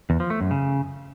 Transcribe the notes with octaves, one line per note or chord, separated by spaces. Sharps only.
E2
F3
A3
F#2
C#3